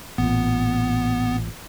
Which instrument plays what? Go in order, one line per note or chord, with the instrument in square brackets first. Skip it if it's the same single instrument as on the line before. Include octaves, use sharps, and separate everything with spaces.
[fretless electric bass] A1 A#2 [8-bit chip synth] B3